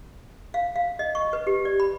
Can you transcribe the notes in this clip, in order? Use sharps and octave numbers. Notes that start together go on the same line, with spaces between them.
F5
F5
D#5
C#6
B4
G4
D5
B5